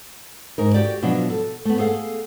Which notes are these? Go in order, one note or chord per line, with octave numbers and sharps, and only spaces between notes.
G#2 D#4 A#4
F#4 G4 D5
B2 F3 F#3 B3 D4
A4
A3 B3
G#4 A4 F5 F#5